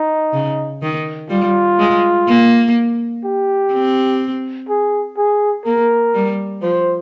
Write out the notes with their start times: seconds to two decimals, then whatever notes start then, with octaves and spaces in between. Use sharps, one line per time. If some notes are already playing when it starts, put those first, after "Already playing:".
Already playing: D#4
0.33 C#3
0.82 D#3
1.30 G3 F4
1.79 G#3
2.28 A#3
3.24 G4
3.73 C4
4.69 G#4
5.17 G#4
5.65 A#3 A#4
6.14 G3
6.62 F3 C5